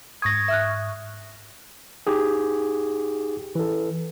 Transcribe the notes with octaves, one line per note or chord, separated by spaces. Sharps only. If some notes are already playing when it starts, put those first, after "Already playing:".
G#2 C#6 D#6 G#6 A#6
E5 F6 F#6
D#4 G4 G#4
E3 A4